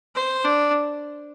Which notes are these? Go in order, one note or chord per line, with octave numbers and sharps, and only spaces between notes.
C5
D4